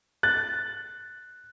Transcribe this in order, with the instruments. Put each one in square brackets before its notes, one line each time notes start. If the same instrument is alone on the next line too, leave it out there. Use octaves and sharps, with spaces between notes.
[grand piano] F#6 A6